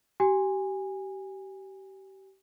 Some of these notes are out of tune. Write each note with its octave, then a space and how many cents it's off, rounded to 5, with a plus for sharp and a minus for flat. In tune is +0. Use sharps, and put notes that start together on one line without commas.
G4 -30 G#5 -20